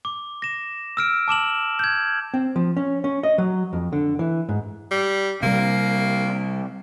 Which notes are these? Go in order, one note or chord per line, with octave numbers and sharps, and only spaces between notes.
D6
A#6 E7
E6 F6 D7
A5 D6 E7 F#7
G6 G#6
C4
F3
C#4
C#4
D#5
F#3
F2
D3
E3
G#2
G3
C3 G3 A#3